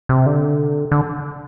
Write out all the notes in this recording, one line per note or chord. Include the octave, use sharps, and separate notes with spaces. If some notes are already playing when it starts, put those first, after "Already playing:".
C3
D3
D3